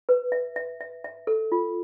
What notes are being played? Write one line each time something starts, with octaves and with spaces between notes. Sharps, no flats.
B4
E5
E5
E5
E5
A4
F4